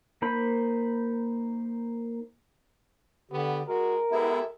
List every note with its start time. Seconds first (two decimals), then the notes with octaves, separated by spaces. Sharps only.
0.22 A#3 D#4 C5 B5
3.31 D3 B3 G4
3.68 G#3 F#4 A#4
4.11 G#3 B3 E4 G4 A4 E5